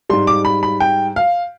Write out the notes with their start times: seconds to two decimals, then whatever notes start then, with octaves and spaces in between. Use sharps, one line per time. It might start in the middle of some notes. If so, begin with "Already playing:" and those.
0.09 G#2 G3 C6
0.27 D6
0.45 B5
0.63 B5
0.80 G5
1.16 F5